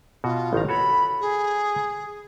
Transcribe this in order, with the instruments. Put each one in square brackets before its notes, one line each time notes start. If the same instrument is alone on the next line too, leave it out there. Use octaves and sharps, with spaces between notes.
[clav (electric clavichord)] B2 F#4 [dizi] F4
[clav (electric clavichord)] A1 D#3 A#5
[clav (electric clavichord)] F#4 A4 C#5 [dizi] B5
[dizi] G#4